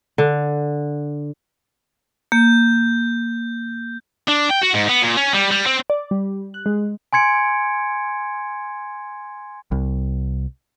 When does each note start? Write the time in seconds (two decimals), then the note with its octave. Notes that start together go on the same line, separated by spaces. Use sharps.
0.18 D3
2.32 A#3 G6
4.28 D4
4.49 G5
4.62 F#4
4.74 G#2
4.89 B3
5.02 A#2
5.17 C#4
5.34 G3
5.51 G3
5.66 C4
5.90 D5
6.11 G3
6.54 F#6
6.66 G#3
7.13 G#5 C6 G#6 C#7 D7
9.72 C2